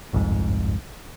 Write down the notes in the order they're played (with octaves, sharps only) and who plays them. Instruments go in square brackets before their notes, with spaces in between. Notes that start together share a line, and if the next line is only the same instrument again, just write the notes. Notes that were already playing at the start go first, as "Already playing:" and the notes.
[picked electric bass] G1 C2 F2 G#2